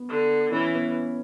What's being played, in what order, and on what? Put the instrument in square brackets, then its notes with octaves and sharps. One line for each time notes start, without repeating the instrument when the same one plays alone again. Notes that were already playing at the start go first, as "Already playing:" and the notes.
Already playing: [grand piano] B3
[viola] D3
[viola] E3 [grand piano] C#4
[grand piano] B3